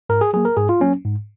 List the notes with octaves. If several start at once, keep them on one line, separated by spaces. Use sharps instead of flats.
G#2 A#4
G#4
F#3 A#3 G#4
A#4
G#2 G#4
F4
F#3 A#3 C#4
G#2